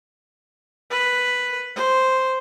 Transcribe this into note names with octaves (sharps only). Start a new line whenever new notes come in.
B4
C5